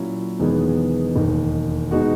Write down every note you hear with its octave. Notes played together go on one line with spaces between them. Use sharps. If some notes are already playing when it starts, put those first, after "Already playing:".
Already playing: A#2 F#3 C#4 E4
E1 E2 D#3 G#3 B3
E1 D#2 D#3
B2 G#3 D#4 F#4